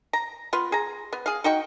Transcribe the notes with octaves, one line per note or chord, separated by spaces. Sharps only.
A#5
B3 F4 B4
G#4 A#5
B3
G#4 F5
D#4 F#4 G5 C#6